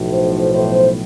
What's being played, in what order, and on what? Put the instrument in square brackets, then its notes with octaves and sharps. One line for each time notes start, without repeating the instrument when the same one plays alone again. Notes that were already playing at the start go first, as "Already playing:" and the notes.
Already playing: [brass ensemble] B1 A2 F3
C5
C5